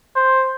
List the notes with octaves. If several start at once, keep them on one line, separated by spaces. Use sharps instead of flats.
C5